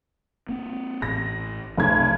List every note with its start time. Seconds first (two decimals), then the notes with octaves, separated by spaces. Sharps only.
0.49 A#3 C4
1.02 A1 A2 A#6
1.77 F1 B1 A3 C#4 G#6